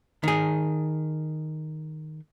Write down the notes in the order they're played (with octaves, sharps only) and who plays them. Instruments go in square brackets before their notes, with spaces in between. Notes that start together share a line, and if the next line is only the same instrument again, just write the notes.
[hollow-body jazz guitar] D#3 G#4